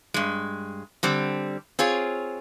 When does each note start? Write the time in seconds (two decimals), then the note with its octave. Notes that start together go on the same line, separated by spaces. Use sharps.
0.14 G2 G#3
1.03 D3 G3 C4
1.79 C4 F4 G#4 C#5